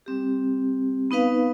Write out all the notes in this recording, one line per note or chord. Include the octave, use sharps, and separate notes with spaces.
G3 C4 G4
B3 D#4 B4 F5